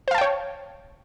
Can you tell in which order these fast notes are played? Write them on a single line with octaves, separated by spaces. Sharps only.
C5 F5 A5 G5 C#5